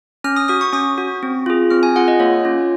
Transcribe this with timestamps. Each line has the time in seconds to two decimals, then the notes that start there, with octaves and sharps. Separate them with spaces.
0.24 C#4 F6
0.36 D#6
0.48 F#4 D#6
0.61 C#6
0.73 C#4 D#6
0.98 F#4
1.23 C4
1.46 F4 G#4
1.70 C4 F6
1.83 G#5
1.96 F4 G#4 F#5
2.08 D#5
2.20 A#3 C#5
2.45 C#4 F4